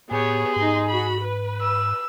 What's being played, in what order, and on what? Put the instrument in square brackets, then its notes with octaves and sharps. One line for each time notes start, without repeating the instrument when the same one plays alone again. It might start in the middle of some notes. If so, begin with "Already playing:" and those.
[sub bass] A2 [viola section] B3 G4 C#5 [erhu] G#4
[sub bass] G#2 [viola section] D#4 C6
[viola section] F#4 B5
B4
[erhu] E6